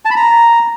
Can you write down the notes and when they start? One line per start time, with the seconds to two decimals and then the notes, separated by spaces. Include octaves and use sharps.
0.05 A5
0.11 B5
0.16 A#5